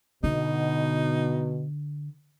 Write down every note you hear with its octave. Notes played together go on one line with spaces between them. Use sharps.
B2 D3 D#4